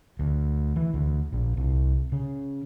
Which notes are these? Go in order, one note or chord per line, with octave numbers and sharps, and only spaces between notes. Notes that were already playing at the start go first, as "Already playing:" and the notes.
D2
E3
D2
A#1
C2
C#3